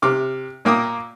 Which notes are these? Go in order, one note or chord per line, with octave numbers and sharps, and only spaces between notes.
C3 D6 F6
A#2 A#3 G5 D6 D#6